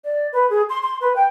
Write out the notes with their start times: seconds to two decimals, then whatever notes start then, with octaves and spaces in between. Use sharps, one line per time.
0.05 D5
0.33 B4
0.50 G#4
0.70 C6
0.83 C6
1.01 B4
1.16 G5